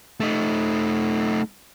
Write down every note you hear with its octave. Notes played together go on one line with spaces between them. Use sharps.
A3 D#4